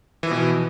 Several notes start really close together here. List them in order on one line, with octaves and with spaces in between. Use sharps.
E3 F3 B2